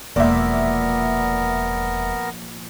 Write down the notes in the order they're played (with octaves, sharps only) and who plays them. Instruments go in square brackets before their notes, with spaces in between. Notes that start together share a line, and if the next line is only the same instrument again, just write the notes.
[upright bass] E1 [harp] A#2 F3 A#3 [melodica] B3 A#4 [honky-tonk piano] D5 E5